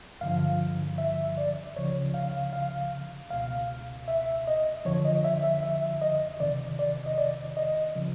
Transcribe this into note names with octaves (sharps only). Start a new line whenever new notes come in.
G2 D3 F3 F5
E5
D5
C#2 C#3 F3 C#5
F5
F5
C#2 B2 F5
E5
D#5
F2 D3 F3 C#5
D#5
E5
E5
E5
D#5
F2 C3 D#3 D5
D5
D#5
D5
D#5
C#3 F3